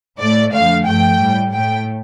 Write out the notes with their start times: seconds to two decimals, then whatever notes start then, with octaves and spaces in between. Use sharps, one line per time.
0.19 A2 A3 D5
0.53 F2 D3 A3 F5
0.86 G2 F3 A3 G5
1.20 A2 G3
1.53 A2 A3 G5